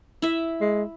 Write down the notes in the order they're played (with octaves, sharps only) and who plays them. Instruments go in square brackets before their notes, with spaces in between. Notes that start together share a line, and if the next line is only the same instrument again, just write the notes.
[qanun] E4 E5
[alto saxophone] G#3